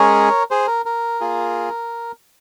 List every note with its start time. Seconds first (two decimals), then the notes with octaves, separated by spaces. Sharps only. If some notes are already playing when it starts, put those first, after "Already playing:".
Already playing: G#3 C#4 G#4 A#4 C#5
0.51 G#4 C5
0.67 A#4
0.86 A#4
1.21 A#3 F4 G#4